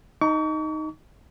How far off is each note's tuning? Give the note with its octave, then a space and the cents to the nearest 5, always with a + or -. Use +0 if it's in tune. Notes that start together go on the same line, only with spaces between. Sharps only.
D#4 +0 A#5 -45 C#6 +40